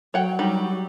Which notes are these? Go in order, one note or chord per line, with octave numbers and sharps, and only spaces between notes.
F#3 C#5 F#5 G5
G3 D#4